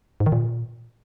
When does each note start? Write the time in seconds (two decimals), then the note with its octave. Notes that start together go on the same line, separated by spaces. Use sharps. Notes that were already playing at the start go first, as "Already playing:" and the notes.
0.20 G#2
0.26 D#3
0.32 A#2